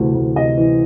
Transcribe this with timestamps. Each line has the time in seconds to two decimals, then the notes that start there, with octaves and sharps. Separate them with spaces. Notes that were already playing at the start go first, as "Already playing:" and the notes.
Already playing: D2 C3 E3
0.14 D2
0.36 C3 D#5
0.57 E3